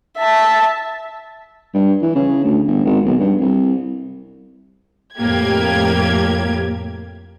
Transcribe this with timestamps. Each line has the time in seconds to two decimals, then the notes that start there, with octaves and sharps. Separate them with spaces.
0.17 E5 A5
1.74 G2
2.02 E3
2.15 C#3
2.44 D2
2.67 G1
2.85 G#1
3.05 B1
3.20 G2
3.41 C2
5.17 F2 A2 A#3 G4 G#6